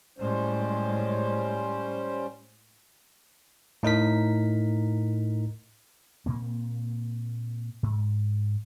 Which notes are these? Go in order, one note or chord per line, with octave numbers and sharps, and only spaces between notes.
A2 G3 G#3 C#4 C5
A2 D#4 A#4 B6
A#2 A#3 C4
G#2